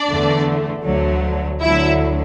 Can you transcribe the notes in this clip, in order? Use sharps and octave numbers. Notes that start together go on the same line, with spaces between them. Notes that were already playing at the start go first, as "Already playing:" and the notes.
Already playing: D4 D5
E2 D3 A3
D2 D3 F#3 A3
D2 D3 F#3 E4 E5